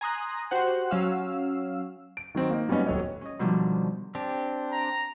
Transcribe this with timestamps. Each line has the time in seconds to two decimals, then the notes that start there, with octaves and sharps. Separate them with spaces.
0.01 G#5 A#5 C6 D#6 F#6 A#6
0.51 F#4 G4 C5 F#5
0.91 F#3 C#4 F5 E6
2.17 D7
2.35 D#3 F#3 C4 D#4
2.50 A#3 D#4
2.69 F#3 G3 A#3 B3 C#4 D#4
2.86 D#1 F#3 A4 C#5 D#5
3.21 C#4 D#5
3.39 B2 D3 D#3 F3 G3
4.15 C4 D4 G4
4.72 A#5